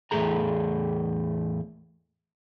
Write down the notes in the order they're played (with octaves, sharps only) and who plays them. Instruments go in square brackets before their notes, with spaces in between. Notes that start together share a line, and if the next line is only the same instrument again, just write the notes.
[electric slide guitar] E2 A2 G3 A3 G#4 A#5